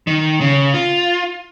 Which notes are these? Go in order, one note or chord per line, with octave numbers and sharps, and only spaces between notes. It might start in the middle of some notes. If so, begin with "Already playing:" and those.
D#3
C#3
F4